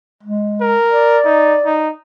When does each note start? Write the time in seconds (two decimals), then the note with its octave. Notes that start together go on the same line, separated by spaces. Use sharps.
0.23 G#3
0.61 A#4
0.90 D5
1.25 D#4
1.65 D#4